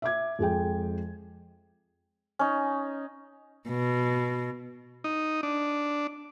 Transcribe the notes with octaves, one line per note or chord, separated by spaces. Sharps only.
E5 D6 G#6
F2 G#3 G#4 G5
C#4 D#4
B2
D#4
D4